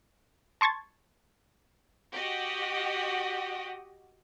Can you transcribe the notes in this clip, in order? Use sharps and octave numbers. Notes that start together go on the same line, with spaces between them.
A5 C6 C#6 G#6 A6
F#4 G4 D#5